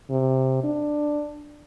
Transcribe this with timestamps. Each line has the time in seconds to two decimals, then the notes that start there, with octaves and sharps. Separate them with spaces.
0.10 C3
0.63 D4